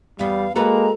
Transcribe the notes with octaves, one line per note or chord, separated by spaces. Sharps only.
E2 G3 B3 F5
G#3 A#3 F#4 A4 B4 A#5